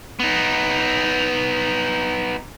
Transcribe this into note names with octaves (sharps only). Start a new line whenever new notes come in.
B3 D#4